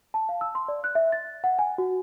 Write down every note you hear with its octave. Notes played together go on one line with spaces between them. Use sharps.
A5
F5
E6
C6
D5
F#6
E5
A6
F#5
G#5
F#4